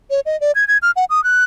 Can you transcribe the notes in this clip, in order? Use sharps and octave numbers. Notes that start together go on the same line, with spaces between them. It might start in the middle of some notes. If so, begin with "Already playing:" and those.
C#5
D#5
D5
G#6
G#6
F6
F#5
D#6
F#6